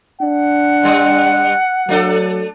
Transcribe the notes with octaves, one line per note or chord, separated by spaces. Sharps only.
D4 F#5
G2 G3
F#3 A3 D4 A4